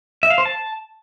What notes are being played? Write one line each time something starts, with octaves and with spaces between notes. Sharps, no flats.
E5
F5
C5
A5